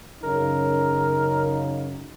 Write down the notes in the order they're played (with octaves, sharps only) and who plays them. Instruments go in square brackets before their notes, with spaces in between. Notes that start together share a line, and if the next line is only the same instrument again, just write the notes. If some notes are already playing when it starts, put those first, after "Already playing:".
[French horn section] F#2 C#3 D#4 [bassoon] A#4